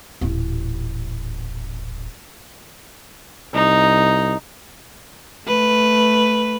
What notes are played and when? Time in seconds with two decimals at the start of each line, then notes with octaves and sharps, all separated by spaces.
0.21 D#1 A1
3.54 C2 D#4
5.47 A3 B4